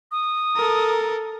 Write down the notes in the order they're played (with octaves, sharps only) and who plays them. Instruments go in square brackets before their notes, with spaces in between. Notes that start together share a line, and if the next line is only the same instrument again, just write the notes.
[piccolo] D#6
[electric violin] A4 A#4